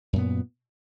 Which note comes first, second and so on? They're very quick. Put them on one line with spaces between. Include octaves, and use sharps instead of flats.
F#2 A#2 B3